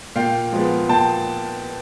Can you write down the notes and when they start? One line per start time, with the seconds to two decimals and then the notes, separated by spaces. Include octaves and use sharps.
0.16 A#2 F5 G5
0.52 F3 G#3 B3
0.89 A#2 G5 A5